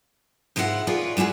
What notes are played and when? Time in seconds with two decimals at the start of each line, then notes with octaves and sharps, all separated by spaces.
0.56 G#2 G#3 E4 F4 G4 F#5
0.87 F4 G#4 B4 C#5 D5
1.17 G3 G#3 E4 F#4 G#4